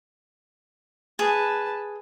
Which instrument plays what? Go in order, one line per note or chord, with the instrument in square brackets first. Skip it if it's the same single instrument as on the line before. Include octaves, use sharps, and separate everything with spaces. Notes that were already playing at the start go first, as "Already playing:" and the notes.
[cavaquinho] G#4 [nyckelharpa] B4 A5